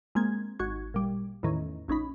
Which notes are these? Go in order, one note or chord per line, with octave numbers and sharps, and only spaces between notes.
G#3 A#3 C4 G#6
G#1 F#4 C#6 G#6
A#2 G3
E2 A2 D#3 C#4
A#1 C#4 D#4 B5